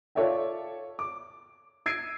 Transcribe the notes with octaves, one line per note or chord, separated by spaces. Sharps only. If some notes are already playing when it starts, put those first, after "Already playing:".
F4 A4 C#5 D5 E5 G5
D6
E6 G#6 C7 D7 D#7